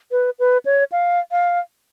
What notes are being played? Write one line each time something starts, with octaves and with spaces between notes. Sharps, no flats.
B4
B4
C#5
F5
F5